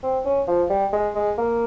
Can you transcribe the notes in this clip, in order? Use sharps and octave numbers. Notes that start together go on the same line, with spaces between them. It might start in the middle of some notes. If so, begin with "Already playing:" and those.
C4
C#4
F3
G3
G#3
G#3
A#3